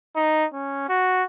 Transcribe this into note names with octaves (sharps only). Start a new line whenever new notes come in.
D#4
C#4
F#4